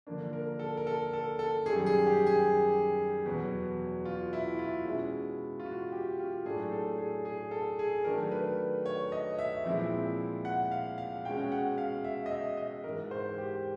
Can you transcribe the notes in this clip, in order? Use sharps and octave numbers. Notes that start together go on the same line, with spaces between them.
D3 F3 A#3 D4
A#4
A4
A#4
A4
A4
A4
F#2 D#3 G3 G#4
G#4
G4
G#4
E2 B2 F#3 B3
F4
E4
F4
B2 G#3 C#4 E4
F4
F#4
G4
F4
A2 F#3 A3 D4 G#4
A4
G#4
G#4
A4
G#4
D#3 F#3 A3 D4 A#4
B4
C#5
D#5
E5
A#2 F3 G#3 C4 E4
F#5
F5
F5
B2 G#3 C#4 G5
F#5
F5
E5
D#5
E5
D#5
G#2 E3 G#3 A#4
C5
G4